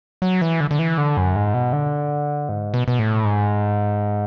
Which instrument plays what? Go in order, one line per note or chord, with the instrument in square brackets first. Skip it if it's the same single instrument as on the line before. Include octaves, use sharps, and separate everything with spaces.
[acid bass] F#3
E3
D3
D3
E3
D3
F#2
G#2
B2
D3
G#2
B2
B2
A2
G#2